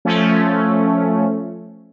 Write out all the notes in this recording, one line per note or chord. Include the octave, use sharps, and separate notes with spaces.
F3 A3 C#4